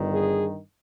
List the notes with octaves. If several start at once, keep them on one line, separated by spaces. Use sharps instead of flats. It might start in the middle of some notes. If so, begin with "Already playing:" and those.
Already playing: G1 G2 D#3
G#4